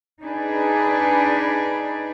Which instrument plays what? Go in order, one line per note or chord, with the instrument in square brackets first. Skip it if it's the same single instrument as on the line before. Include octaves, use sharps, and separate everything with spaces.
[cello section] D4 D#4 G#4 B4 D5